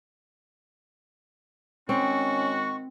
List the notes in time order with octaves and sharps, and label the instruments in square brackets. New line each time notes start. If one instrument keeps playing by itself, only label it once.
[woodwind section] D#3 G#3 F#4 [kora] C4 [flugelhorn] C#4 [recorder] C#6